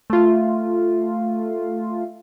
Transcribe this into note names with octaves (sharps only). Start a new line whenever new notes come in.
A3 F4